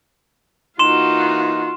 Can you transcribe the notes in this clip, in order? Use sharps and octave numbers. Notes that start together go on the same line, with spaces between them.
E3 A#3 D#4 F4 F#4 C6 E7